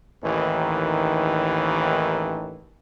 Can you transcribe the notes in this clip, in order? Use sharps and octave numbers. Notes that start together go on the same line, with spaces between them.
A1 D#2 D#3 E3